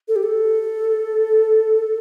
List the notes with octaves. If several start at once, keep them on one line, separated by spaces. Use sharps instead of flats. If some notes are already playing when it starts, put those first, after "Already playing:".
A4
G4
A4